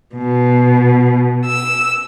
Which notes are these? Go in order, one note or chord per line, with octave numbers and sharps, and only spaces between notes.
B2
E6